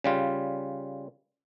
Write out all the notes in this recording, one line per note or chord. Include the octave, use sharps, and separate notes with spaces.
C#3 G3 F4